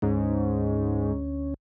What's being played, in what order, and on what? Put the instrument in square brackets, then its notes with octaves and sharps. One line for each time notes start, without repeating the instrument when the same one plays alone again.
[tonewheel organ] D2 C#4 [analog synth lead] G#2